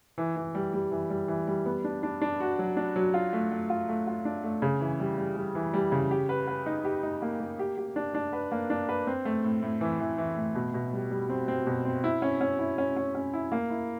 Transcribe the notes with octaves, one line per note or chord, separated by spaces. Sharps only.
E3
E3
G3
G3
E3
G3
E3
G3
B3
D4
D4
D4
F#4
F#3
D4
F#3
F4
A3
A3
F4
A3
F4
D4
A3
C#3
E3
G3
G3
G3
E3
G3
C#3
G4
B4
B4
D#4
G4
D#4
A#3
A#3
G4
G4
D4
D4
B4
A#3
D4
B4
C4
A3
A2
A2
E3
E3
E3
A2
B2
B2
G3
G3
C4
C4
B2
C4
E4
C#4
C#4
E4
C#4
C#4
C#4
E4
A#3
E4